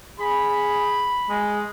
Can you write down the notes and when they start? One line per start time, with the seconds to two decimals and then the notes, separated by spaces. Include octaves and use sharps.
0.20 G#4 B5
1.29 G#3